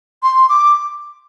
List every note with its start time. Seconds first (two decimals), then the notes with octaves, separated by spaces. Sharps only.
0.23 C6
0.49 D6